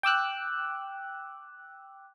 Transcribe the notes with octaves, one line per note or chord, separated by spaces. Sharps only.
G5 D6 E6 F#6